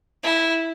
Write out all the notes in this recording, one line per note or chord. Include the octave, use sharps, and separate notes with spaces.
E4